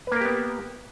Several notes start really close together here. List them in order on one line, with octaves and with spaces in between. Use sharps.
B4 A#3 A#4 G4 B3